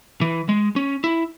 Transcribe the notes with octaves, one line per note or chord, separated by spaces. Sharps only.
E3
G#3
C#4
E4